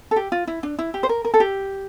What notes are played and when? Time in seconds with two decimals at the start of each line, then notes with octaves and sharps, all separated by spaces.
0.11 A4
0.16 G4
0.32 F4
0.47 E4
0.63 D4
0.79 E4
0.94 G4
1.03 C5
1.09 A#4
1.25 A#4
1.34 A4
1.40 G4